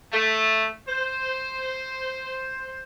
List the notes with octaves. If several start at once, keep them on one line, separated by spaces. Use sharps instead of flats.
A3
C5